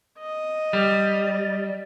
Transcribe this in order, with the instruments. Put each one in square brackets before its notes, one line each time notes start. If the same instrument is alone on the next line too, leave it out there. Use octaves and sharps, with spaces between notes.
[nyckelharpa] D#5
[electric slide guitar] G3